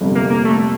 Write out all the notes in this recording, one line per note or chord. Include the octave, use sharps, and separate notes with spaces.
G1 F2 C3
A#3
A#3
A3